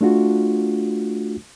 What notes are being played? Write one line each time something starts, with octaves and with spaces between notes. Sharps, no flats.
A3 D4 F4 F#4